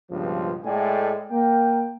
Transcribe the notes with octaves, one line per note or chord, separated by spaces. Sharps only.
C#2 G2 B2 F3
A2 G#3 A3 D5 G5 G#5
A#3 G5